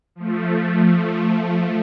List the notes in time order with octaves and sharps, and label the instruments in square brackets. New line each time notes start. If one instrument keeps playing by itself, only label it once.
[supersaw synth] F3 A3